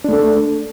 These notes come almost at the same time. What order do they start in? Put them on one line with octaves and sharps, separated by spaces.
D4 A3 A4